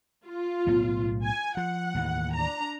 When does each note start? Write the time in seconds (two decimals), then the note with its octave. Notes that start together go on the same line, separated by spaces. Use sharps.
0.25 F4
0.67 B1 A2 B3
1.24 G#5
1.57 F3 F#5
1.95 D#2 A2 E3
2.34 D4 A#5